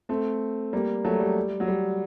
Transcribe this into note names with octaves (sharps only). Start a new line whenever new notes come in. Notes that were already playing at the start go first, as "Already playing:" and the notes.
A3 C4
G3 A#3
F#3 A3
G3
F#3
G3